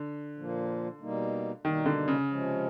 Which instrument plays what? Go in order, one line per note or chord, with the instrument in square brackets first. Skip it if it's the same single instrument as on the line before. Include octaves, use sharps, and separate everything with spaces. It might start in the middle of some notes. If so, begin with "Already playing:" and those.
Already playing: [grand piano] D3
[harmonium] A#2 F3 A#3
B2 G3 A#3 D#4
[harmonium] B2 G3 A#3 D#4 [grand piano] D#3
[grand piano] D3
C#3
[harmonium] C3 F3 G#3 C#4